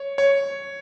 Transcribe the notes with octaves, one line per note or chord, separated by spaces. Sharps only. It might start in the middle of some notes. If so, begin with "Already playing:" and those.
Already playing: C#5
C#5